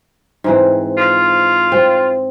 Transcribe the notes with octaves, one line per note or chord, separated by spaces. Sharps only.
G#2 E3 C4
F4
C4